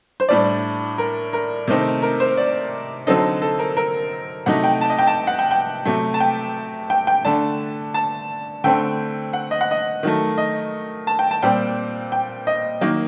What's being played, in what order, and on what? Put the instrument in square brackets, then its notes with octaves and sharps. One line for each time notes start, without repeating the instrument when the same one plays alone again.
[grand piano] C5
A2 G3 D4 D5
A#4
A#4
C3 D#3 A3 C4 D#4
A#4
C5
D5
D3 F#3 C4 D#4 A4
A4
A#4
A#4
C3 F#3 A3 D#4 F#5
G5
A5
D#5
G5
A5
F#5
G5
G5
C3 F#3 A3
A5
G5
G5
G5
D3 A3 D4 A5
A5
D3 A3 C4 G5
F#5
D#5
F#5
D#5
D#3 F#3 A3
D#5
A5
G5
A5
A#2 G3 C4 G5
G5
D#5
D#3 F#3 A#3